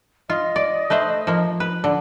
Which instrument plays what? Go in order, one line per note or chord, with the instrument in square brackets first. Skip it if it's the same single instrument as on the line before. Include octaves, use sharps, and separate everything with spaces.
[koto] F4 [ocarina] D#5
[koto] D5
A3 B4 C5
F3 A#3
B4
D3